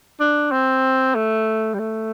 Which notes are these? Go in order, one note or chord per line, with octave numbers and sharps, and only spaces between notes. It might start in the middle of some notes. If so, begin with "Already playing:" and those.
D4
C4
A3
G3
A3